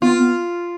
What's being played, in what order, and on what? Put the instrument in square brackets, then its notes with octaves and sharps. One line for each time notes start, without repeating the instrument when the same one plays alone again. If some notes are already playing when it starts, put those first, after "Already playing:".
[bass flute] B3 [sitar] F4
[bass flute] B3